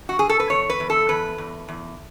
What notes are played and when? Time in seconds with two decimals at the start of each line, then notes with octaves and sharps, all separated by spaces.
0.09 F#4
0.19 G#4
0.29 A4
0.40 B4
0.50 E2 C#5
0.70 B4
0.80 E2
0.90 A4
1.09 E2 B4
1.38 E2
1.68 E2